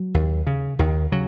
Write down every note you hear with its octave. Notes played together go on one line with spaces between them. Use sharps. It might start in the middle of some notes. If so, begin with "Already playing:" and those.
Already playing: F#3
D#2
C#3
D#2 D#3
C#3 F#3